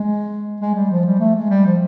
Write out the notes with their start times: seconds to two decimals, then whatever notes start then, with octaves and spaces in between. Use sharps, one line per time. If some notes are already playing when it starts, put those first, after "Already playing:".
Already playing: G#3
0.60 G#3
0.75 G3
0.91 F3
1.05 G3
1.20 A3
1.35 G#3
1.50 G3
1.66 F3